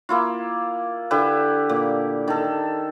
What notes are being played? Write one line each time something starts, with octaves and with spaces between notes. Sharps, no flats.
A#3 E4 F4
D3 E4 G4 B4
A#2
D#3 A4